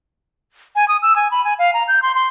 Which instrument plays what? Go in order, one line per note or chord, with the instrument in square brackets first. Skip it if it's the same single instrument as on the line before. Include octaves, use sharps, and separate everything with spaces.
[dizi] G#5
D#6
E6
G#5
B5
G#5
F5
A#5
G6
C6
C6